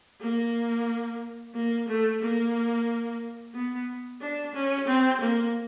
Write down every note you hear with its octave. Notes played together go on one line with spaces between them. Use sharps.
A#3
A#3
A3
A#3
B3
D4
C#4
C4
A#3